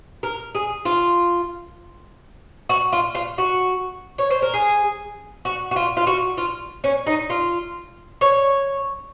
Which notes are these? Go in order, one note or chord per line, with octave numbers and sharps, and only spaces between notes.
A#4
G#4
F4
F#4
F4
F4
F#4
C#5
C5
A#4
G#4
F#4
F#4
F4
F4
F#4
F4
C#4
D#4
F4
C#5